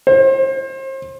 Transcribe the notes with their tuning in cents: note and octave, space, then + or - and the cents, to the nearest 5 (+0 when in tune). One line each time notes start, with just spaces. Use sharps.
C5 +35